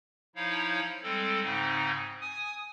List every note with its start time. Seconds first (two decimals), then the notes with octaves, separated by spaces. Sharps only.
0.35 F3 D#4 E4 C#5 F5
1.03 G3 G#3 C4 A4
1.42 G#2 C#3 C4 D#4
2.21 G#5 D#6